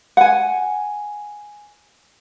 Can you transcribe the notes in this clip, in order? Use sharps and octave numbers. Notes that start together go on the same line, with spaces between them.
F#5 G#5